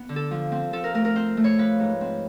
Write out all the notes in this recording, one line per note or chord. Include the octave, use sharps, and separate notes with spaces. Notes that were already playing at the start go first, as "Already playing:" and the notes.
Already playing: B3
D3
A4
F3
C4
F3 A4
A#4
A3 A#4
A#4
C4 C5
A3
C#5
F3 B4
G#2
C4